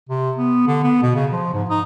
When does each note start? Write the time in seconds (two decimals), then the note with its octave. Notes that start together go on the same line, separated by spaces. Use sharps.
0.09 C3
0.37 B3
0.67 D3
0.84 B3
1.03 B2
1.15 C#3
1.32 F3
1.54 G#2
1.70 D#4